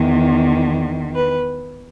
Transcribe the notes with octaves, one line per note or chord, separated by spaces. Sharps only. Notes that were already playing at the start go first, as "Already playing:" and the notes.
Already playing: E2 D#3
B4